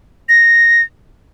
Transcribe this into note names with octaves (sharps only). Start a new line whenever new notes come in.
A#6